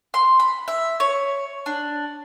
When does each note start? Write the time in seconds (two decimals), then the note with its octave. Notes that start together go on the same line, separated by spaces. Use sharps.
0.14 C6
0.40 B5
0.68 E5
1.00 C#5
1.66 D4